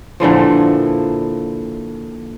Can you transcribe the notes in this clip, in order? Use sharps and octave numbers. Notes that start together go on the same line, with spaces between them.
A#2 D3 E3 F3